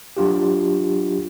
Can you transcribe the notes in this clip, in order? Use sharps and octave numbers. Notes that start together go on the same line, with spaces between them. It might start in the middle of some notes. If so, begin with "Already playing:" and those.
F#3 D4 F4 G4